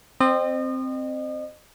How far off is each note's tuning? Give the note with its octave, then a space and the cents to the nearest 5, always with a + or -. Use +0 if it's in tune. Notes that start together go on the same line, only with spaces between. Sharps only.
C4 +0 D#5 -35